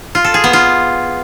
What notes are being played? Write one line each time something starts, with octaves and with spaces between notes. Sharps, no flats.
F4
A4
G#4
B3
F4